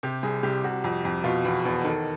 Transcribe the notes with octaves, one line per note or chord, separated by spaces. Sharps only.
C3 G4
C2 G#4
C2 G4
C3 F#4
F2
F2
B2 F4
E2
E2
D#3 A4